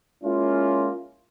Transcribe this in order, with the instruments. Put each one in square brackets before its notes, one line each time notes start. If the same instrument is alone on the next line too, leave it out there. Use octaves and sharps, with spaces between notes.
[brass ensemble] G#3 A#3 C#4 E4 F4